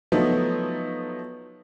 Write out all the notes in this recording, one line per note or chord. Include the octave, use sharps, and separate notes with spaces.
F3 F#3 A3 B3 D#4